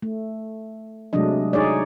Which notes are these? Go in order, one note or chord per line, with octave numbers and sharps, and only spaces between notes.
A3
C3 F#3 G#3 A3 D4 D#5
D#4 G#4 C#5 D5